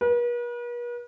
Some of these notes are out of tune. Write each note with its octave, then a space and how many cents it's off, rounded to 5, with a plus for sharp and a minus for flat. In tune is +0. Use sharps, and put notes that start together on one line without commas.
B4 -45